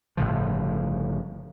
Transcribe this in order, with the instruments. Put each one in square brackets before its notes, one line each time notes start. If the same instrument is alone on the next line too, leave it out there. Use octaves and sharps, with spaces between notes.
[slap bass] G1 A2 C#3 F3